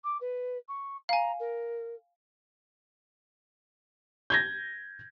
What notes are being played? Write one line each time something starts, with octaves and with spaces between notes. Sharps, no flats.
D6
B4
C#6
F5 G#5 A#5
A#4
G6 G#6 A#6